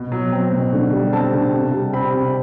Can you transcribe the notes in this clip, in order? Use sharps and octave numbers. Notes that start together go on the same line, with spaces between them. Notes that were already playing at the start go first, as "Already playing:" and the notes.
Already playing: B2
F#3
C4
B2
D3
G3
C4 A5
D3
C3
G3
C4 B5
C3